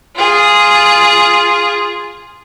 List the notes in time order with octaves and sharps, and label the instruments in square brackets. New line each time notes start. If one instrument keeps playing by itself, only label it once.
[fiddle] F4 G#4